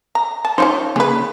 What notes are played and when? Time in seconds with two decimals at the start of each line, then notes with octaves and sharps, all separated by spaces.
0.15 A#5
0.45 A5
0.58 C#4 D#4 F4 C5 C#5
0.96 C#3 A#3 B3 G#4 B4